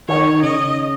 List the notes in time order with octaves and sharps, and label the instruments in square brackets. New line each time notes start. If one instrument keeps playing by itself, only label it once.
[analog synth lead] D#3 [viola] C#5
[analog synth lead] C#3 [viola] D#5